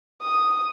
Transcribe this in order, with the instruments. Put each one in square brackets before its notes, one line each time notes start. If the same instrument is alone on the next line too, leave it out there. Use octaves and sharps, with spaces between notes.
[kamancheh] D#6